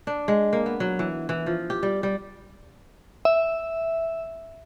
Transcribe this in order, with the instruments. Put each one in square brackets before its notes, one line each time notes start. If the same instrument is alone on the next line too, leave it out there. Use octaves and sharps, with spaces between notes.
[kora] D4
G#3
A#3
B3
F#3
E3
E3
F3
G4
G3
G3
[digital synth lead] E5